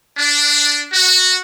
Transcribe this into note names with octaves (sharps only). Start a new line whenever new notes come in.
D4
F#4